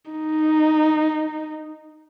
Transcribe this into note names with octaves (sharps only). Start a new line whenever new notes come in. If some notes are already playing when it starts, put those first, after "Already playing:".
D#4